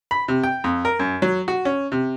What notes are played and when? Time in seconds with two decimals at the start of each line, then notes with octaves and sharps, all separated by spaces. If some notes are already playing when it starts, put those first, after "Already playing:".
0.11 B5
0.28 C3
0.44 G5
0.64 F2
0.85 A#4
0.99 F#2
1.22 F#3
1.48 F#4
1.65 C#4
1.92 C3